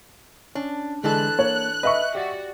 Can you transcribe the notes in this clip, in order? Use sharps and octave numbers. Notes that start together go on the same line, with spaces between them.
C#4 D4
D3 E3 G#3 D4 A4 F#6
A#3 C#5
B4 D#5 E5 C#6
F#4 G4 D5 A6